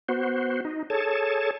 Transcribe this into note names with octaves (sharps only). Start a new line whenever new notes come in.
B3 F#4 C5
D#4
G#4 A4 C#5 A5